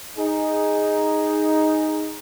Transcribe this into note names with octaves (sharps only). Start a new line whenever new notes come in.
D#4 G#4